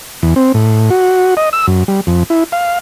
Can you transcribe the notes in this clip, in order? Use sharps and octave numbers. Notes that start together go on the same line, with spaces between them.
E2
C4
A2
F#4
D#5
E6
F#2
G3
F2
E4
F5